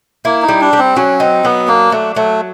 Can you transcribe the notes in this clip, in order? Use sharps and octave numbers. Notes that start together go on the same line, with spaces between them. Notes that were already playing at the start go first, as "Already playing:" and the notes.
A#3 E4
D#4
G3
D4
G3
C4
F#3 C#4
C4 D#4
F#3 B3
A#3 D4
F#3 A3
F#3 A3